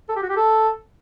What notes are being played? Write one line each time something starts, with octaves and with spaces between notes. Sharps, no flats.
A4
G4
F#4
G4
A4